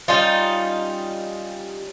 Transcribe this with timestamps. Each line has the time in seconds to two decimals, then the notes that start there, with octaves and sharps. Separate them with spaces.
0.08 G3 C#4 D#4 F4